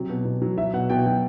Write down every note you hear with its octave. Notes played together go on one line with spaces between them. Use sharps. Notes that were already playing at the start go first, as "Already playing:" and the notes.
Already playing: C3 F#3
B2
B2
F#3
F#3 E5
B2 F#5
B2 G5
F#3 G5